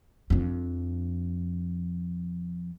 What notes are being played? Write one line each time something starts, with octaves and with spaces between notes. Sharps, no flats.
F2 D4